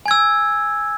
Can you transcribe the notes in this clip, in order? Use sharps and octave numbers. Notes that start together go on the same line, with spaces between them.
G#5 E6 G#6